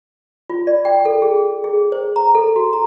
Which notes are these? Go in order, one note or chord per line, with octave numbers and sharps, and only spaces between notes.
F4
D5
G5
A4
G#4
G#4
C5
A#5
A4
F#4
A#5